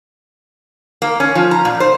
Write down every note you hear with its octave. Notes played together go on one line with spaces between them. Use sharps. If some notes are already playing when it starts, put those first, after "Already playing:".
A#3
C#4
F3
A#5
A#2
C5